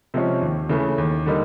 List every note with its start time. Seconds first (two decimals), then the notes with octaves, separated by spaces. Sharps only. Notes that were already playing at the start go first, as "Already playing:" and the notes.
0.14 C3 F3 G#3 C#4
0.41 D#2
0.69 C#3 E3 A3
0.98 D#2
1.26 D3 G3 A#3 D#4